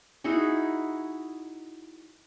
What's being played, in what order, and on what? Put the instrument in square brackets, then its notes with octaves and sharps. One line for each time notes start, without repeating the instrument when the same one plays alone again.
[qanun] D#4 E4 F#4 G#4